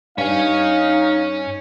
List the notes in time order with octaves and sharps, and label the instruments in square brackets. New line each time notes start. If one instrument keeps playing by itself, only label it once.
[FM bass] G2 [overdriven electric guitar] C#4 G#5 [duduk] D#4 [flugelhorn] F5